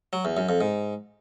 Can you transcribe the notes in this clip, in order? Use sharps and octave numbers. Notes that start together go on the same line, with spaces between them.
F#3
E2
F#2
F2
G#2